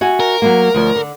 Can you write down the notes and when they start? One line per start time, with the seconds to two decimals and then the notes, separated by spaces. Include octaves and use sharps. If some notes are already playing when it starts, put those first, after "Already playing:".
0.01 F#4 E5 G#5
0.20 A#4
0.42 F#3 G#3 A#3
0.74 D2 F3 C#5
0.96 D3